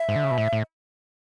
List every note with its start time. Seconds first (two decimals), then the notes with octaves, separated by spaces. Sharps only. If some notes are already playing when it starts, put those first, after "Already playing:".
Already playing: E5
0.09 G#2
0.16 D3
0.24 C#3
0.31 B2
0.38 A2
0.53 A2